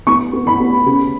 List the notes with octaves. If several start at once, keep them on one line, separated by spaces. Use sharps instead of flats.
B3 C#6
B3
B5
B3
C#3